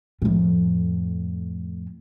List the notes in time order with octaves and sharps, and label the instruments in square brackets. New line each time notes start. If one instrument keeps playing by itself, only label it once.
[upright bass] F2 A2